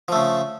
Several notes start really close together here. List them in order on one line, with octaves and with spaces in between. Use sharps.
F3 A3 C#3